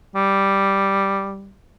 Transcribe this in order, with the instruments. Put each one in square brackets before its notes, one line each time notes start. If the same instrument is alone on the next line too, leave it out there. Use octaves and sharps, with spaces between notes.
[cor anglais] G3